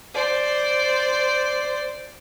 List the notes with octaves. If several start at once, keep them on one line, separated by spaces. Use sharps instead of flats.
C5 D5